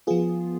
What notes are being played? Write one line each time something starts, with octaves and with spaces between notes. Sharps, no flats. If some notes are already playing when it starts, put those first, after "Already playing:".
F3 B3 F4 G#4